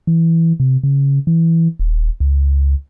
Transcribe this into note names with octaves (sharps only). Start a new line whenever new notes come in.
E3
C3
C#3
E3
D#1
C#2